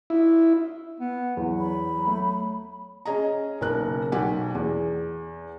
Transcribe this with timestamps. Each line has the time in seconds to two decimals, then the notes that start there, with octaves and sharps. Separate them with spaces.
0.10 E4
1.00 B3
1.37 E2 F#3
1.58 B5
1.88 F#3
2.07 A3
3.05 C#4 G#4 D#5 A#5
3.61 F#1 B1 A#4 F#6
4.12 B1 G4 F#5 G#5
4.55 E2